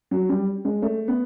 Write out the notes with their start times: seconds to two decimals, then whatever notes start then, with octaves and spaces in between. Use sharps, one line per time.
0.11 F#3
0.29 G3
0.65 G#3
0.82 A3
1.08 B3